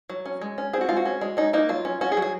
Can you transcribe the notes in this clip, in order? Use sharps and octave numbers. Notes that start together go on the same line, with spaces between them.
F#3
C#4
G#3
C#4
C4 G#4
F#4
G#3 F4
F#4
C#4
G#3
C#4 D#4
A#3 D#4
F#3 F4
C#4
C#4 F#4
G#4
F#3
G#4